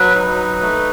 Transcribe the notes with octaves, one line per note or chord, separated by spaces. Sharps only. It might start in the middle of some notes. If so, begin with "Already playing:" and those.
Already playing: F#3 B4
D#4
A3